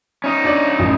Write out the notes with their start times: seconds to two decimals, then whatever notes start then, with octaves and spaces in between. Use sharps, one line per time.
0.24 C#4 D#4
0.44 D4 C#5 D5
0.79 A1 F#2